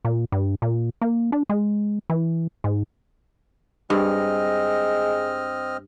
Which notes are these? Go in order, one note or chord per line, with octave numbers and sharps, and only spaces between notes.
A#2
G2
A#2
A#3
D4
G#3
E3
G#2
G2 G#3 C4 D#5 F6